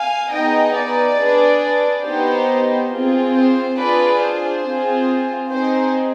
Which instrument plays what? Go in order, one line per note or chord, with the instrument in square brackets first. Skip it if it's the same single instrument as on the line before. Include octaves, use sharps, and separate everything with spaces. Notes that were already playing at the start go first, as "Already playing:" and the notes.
Already playing: [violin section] F5 G#5
B3 D#4 G#4 D#5 G5
B4 D5
D4 G#4
B3 D#4 G4 C5
C4 F4 G#4
C5
D4 F4 G#4 B4 D5
C5
C4 F4 G#4
C4 D#4 G#4 C5